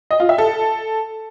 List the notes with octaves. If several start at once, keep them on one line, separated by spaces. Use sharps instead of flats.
D#5
F4
E5
A4